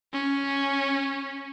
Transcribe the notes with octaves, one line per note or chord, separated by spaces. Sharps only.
C#4